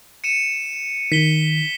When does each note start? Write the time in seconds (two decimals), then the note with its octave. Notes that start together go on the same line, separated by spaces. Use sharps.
0.24 C#7 D#7 E7
1.12 D#3 B6 G7